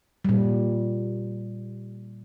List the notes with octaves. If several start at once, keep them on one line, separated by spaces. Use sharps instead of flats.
A#2 G3